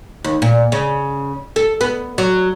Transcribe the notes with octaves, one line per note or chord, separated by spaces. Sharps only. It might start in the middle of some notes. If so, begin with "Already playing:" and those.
D#2
A#2
C#3
A4
B3
F#3